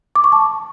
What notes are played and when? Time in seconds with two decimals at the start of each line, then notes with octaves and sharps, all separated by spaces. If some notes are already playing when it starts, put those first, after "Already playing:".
0.16 D6
0.24 C#6
0.32 A5